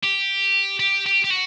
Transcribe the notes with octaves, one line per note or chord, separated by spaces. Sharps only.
G4
G4
G4
G4
F#4